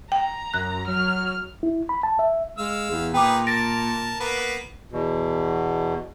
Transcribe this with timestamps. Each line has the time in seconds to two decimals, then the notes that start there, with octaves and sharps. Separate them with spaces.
0.12 G5 A#5
0.54 F#2 F#6
0.87 F#3 F6
1.63 E4
1.89 B5
2.03 A5
2.19 E5
2.58 G#3 F5 E6
2.90 E2
3.14 A#2 D#4 G#4 B4 G5 D6
3.47 A#4 A5 A6 A#6 D7
4.20 A#3 B3 B4
4.92 E2 B2